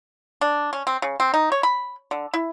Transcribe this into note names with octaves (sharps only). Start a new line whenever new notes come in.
D4
C#4
C4
C#3
C4
D#4
C#5
B5
D3
E4